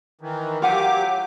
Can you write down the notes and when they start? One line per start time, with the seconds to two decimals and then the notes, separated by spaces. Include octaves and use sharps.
0.21 D#3 E3
0.62 F#3 F4 G4 F#5 G#5 D6